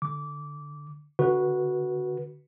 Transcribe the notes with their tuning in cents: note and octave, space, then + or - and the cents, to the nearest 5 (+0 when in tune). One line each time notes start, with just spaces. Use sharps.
D3 +0 D6 -20
D3 -20 F#4 +0 B4 -20